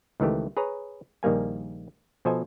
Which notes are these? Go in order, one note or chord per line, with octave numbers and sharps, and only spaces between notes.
C#2 D#3 E3 A3 G4
G#4 B4 C#5 A#5
A#1 D#3 G3 A#3 G#5
B2 F3 A4 C5 D#5 G#5